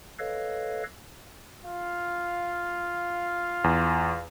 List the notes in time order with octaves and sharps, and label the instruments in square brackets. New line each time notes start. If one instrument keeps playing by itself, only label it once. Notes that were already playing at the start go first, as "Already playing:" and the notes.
[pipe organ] A4 B4 C#5 D#5 F5
[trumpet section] F4 F5
[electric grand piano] E2